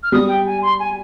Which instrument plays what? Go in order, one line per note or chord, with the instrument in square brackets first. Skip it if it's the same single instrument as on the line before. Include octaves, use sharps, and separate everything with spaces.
[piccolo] F6
[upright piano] G3 [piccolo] D#6
[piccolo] G5
G#5
C6
G#5